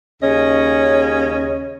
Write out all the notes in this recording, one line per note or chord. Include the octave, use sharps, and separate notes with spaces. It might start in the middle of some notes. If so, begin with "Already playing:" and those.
D#2 C#3 C#4 D#5